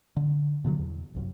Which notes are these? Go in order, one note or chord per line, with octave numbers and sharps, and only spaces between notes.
D3
B2 D3 E3 F#3
E2
G1 C2 F#2